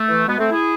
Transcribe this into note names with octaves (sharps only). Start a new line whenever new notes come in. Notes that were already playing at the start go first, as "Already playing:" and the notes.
Already playing: A3
E3
B2 G#3 B3
A3 C4
E4 G#4